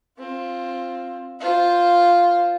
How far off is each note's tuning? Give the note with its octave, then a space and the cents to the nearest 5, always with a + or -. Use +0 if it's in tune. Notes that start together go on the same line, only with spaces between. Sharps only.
C4 +15 F4 +0
F4 +0 C5 +0